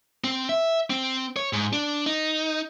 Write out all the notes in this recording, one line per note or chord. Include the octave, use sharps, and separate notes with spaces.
C4
E5
C4
C#5
G#2
D4
D#4